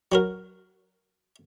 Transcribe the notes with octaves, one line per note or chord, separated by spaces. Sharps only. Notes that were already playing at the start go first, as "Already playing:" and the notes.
F#3 F#4 A#4